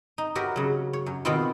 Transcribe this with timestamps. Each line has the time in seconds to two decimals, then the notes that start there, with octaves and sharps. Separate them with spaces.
0.18 D#4
0.35 F#4 G4 A#4 B4 C#5 E5
0.56 C#3 F#3
0.93 C#5
1.06 F#2
1.25 B2 D#3 B3 C4 E4 F4